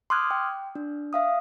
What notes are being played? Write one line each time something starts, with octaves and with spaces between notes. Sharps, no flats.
C6 D6 D#6 F6 F#6 G#6
G5
D4
E5 F5 D#6